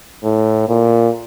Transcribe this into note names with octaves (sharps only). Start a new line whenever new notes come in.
A2
A#2